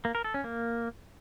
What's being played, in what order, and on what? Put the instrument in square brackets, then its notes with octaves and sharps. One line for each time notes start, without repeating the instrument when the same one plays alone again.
[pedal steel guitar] A#3
A#4
A4
C#4
A#3